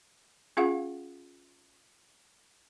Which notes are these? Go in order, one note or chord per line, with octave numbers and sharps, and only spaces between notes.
C#4 F4 G#4 F5 F#5